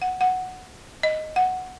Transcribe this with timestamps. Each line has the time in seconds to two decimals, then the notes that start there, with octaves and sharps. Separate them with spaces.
0.02 F#5
0.21 F#5
1.03 D#5
1.36 F#5